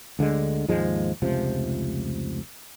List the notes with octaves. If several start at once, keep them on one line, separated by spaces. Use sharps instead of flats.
D2 D3 D#3 G#3
D#2 G#2 F3 G#3
F1 C#2 C3 F3